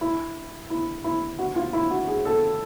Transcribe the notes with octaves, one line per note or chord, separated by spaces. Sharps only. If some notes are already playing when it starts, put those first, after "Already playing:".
E4
E4
E4
F#4
F4
E4
F#4
G#4
A4